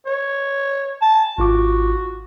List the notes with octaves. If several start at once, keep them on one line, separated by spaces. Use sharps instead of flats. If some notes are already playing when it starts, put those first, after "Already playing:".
C#5
A5
G#1 F4 F#4 D6